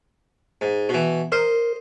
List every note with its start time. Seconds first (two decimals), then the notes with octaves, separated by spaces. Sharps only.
0.61 G#2
0.89 B2 E3
1.32 A#4 C5 D#5